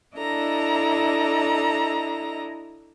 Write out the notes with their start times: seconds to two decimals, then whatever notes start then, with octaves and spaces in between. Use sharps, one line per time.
0.15 D4 E4 A4 D#5 A#5